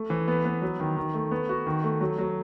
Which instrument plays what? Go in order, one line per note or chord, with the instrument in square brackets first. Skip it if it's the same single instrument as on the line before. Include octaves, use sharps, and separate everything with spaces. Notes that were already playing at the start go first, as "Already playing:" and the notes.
Already playing: [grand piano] A3
E3
B3
B3
F#3
D#3
D#3
A3
B3
F#4
D#3
A3
F#3
F#3